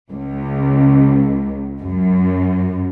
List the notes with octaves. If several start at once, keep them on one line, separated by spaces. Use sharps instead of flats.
C#2
F#2